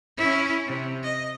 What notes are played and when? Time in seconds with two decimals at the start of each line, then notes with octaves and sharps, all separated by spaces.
0.17 C#4 E4
0.66 C3
1.03 D#5